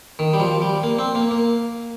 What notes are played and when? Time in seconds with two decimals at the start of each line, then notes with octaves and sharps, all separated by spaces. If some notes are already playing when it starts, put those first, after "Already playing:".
0.19 D#3
0.33 G3
0.40 F3
0.61 G3
0.83 A#3
0.99 C4
1.15 A#3
1.31 A#3